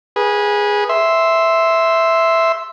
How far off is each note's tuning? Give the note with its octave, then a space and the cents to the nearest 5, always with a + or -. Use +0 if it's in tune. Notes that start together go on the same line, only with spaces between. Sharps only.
G#4 -10 B4 -30
E5 +0 C6 +0